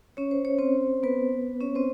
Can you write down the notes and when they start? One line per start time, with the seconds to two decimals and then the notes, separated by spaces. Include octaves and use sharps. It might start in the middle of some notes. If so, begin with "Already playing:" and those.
0.17 C#4 C#5
0.31 C5
0.45 C#5
0.59 C4 C5
1.03 B3 B4
1.61 C#4 C#5
1.75 C4 C5